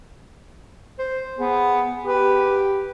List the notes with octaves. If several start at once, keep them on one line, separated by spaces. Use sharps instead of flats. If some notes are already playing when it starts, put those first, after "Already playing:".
C5
B3 G#4
G4 B4